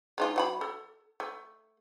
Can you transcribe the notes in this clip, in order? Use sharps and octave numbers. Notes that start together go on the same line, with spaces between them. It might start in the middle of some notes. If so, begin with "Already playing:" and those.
G#3 D#4 F4
F#3 F#5 B5
A4
A3